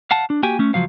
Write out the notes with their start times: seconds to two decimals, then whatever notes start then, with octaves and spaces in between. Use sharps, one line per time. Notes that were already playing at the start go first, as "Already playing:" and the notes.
0.11 F5 F#5 A5
0.30 D4
0.43 A#3 F#4 G4 G5 G#5
0.59 A3 C#4
0.74 C#2 F3 F#3 F5